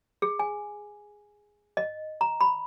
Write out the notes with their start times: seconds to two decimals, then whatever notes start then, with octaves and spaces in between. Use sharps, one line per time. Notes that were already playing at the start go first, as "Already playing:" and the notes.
0.22 G#4
0.39 G#5
1.77 D#5
2.21 A#5
2.41 B5